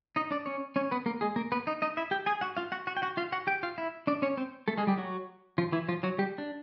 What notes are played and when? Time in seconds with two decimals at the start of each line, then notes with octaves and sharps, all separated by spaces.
0.16 D#4 D#5
0.31 D4 D5
0.46 C#4 C#5
0.76 C#4 C#5
0.91 B3 B4
1.06 A#3 A#4
1.21 G#3 G#4
1.36 A#3 A#4
1.52 B3 B4
1.67 D#4 D#5
1.82 D#4 D#5
1.97 E4 E5
2.11 G4 G5
2.26 G#4 G#5
2.41 F#4 F#5
2.57 F4 F5
2.72 F#4 F#5
2.87 F#4 F#5
2.97 G5
3.02 F#4 F#5
3.17 F4 F5
3.32 F#4 F#5
3.47 G4 G5
3.63 F4 F5
3.78 E4 E5
4.07 D4 D5
4.22 C#4 C#5
4.37 C4 C5
4.68 A3 A4
4.78 G#3 G#4
4.87 G3 G4
4.98 F#3 F#4
5.58 F3 F4
5.72 E3 E4
5.88 F3 F4
6.03 F#3 F#4
6.18 G3 G4
6.38 D4